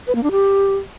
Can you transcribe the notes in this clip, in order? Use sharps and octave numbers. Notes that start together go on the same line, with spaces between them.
B4
A#3
D4
G4